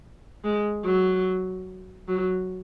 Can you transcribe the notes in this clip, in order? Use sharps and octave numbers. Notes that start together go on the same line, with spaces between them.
G#3
F#3
F#3